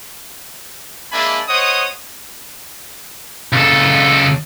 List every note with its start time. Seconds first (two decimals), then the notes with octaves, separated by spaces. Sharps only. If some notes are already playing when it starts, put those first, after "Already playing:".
1.12 G#3 A#3 D4 E5 G#5 B5
1.48 C5 C#5 D#5 F#5 D#6
3.53 C#2 A4